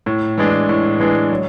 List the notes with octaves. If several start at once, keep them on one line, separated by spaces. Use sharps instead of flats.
A2
E3 G#3 D4
A2
E3 G#3 D4
F#3